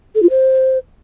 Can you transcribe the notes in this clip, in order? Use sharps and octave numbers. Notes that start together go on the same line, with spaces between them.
A4
F4
C5